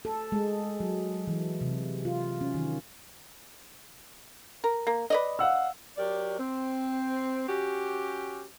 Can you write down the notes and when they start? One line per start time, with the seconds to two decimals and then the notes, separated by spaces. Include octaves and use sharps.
0.05 A4
0.32 G#3
0.80 F#3
1.28 E3
1.61 C3
2.05 F4
2.41 C#4
2.54 D#3
4.64 A#4
4.87 A#3
5.10 B4 D5 D#5
5.39 F5 F#5 E6
5.97 F#3 G4 A#4 D5
6.39 C4
7.48 C#4 F#4 G4